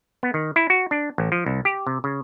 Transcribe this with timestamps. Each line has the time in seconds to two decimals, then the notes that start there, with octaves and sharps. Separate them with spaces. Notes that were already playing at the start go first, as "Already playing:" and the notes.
0.23 B3
0.34 D#3
0.56 E4
0.70 F#4
0.91 D4
1.18 A1
1.32 F3
1.46 C2
1.65 G4
1.87 C3
2.04 C#3